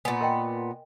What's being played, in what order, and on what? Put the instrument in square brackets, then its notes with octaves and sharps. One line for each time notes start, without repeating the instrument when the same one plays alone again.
[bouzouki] A#2 B3 [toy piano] G#5
[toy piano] A#4 D#5 G5